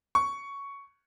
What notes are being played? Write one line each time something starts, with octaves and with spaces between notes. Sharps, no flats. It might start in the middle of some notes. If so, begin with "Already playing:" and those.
C#6